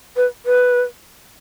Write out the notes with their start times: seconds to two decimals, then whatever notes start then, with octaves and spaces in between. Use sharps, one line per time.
0.16 B4
0.46 B4